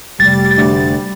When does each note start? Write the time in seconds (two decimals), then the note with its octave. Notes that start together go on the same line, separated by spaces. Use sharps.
0.20 F1 G3 A6
0.58 D2